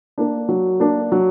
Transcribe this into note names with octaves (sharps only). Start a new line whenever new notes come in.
A#3 D4
F#3
A#3 D4
F#3